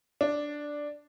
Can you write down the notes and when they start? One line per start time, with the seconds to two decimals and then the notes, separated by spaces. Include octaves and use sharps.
0.21 D4